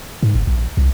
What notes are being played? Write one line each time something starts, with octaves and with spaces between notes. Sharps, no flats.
G#2
G1
A#1
C2